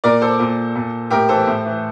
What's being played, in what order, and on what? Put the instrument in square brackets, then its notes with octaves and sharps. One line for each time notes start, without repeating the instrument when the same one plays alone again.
[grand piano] A#2 A#4 D5
A4 C5
A#2
A#2
A2 G4 A#4
E3 A4 C5
A2
E3